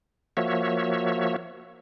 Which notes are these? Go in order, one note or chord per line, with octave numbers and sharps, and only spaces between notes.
F3 A#3 F#4 C#5 E5